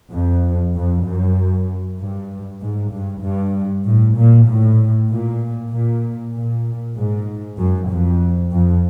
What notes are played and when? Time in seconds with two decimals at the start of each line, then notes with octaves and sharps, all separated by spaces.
0.12 F2
0.75 F2
1.05 F#2
1.98 G2
2.61 G#2
2.92 G2
3.23 G2
3.85 A2
4.16 A#2
4.47 A2
5.09 A#2
5.72 A#2
6.33 A#2
6.96 G#2
7.58 F#2
7.89 F2
8.51 F2